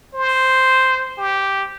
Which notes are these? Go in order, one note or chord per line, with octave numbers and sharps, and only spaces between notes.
C5
G4